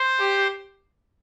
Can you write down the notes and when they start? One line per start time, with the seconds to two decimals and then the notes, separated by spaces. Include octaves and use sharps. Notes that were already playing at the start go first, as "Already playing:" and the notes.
Already playing: C5
0.19 G4